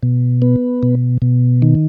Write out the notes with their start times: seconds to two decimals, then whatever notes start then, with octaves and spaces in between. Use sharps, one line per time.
0.03 B2
0.42 B3
0.83 B2
1.22 B2
1.62 D#3